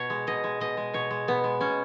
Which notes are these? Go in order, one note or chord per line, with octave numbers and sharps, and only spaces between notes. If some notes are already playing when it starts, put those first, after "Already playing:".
Already playing: B2 C#5
G#3
B2 D#5
G#3
B2 D#5
G#3
B2 C#5
G#3
B2 B3
G#3
B2 C#4